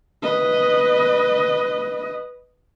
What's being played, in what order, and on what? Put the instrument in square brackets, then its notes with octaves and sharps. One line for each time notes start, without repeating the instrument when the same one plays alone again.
[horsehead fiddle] B4 D#5